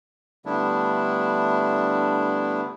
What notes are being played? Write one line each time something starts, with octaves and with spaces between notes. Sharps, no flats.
D3 G3 A3 B3 D4 E4